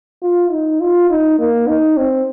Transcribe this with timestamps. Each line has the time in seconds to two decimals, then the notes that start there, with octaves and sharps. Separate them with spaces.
0.22 F4
0.51 D#4
0.80 F4
1.10 D#4
1.39 A#3
1.68 D#4
1.97 C4